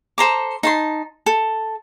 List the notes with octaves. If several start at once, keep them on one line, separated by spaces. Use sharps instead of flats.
A4 C5 A#5 D6
D#4 A5 C6
A4